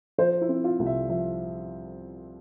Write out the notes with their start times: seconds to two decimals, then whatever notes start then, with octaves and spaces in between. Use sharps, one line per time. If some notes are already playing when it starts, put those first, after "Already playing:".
0.18 F3 C5
0.41 E4
0.49 C4
0.64 F4
0.79 C2
0.86 E5
1.09 F3 E5